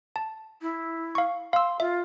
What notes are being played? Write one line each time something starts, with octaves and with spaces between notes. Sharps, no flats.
A5
E4
F5 C#6
F5 C6 E6
F4 E5